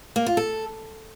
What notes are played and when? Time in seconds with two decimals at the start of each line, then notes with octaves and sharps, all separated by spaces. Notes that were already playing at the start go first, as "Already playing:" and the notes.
0.16 A#3
0.26 F4
0.37 A4